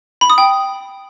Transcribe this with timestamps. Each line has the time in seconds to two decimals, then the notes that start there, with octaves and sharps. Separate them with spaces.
0.21 B5
0.30 D#6
0.38 G5